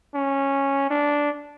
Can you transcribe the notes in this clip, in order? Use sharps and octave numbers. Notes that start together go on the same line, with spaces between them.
C#4
D4